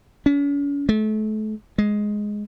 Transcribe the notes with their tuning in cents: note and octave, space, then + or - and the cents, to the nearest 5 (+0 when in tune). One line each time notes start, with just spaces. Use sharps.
C#4 +40
A3 -35
G#3 +5